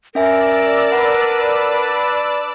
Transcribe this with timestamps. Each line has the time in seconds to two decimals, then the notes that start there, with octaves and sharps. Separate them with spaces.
0.15 C#4 A#4 D5 E5 G#5 E6
0.92 D4 B4 F#5